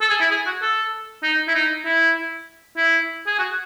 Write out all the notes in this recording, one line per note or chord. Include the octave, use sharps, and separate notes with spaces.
A4
G#4
E4
G#4
F#4
A4
D#4
E4
D#4
E4
E4
G#4
F#4